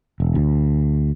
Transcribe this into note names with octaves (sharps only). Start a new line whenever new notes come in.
E1
D2